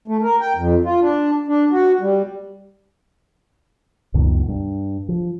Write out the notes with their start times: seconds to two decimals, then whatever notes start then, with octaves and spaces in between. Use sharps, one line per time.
0.08 A3
0.23 A#4
0.41 G5
0.56 F2
0.85 F4
1.01 D4
1.48 D4
1.71 F#4
2.01 G3
4.14 C#2 F#2 B2 D#3
4.48 G2
5.09 F3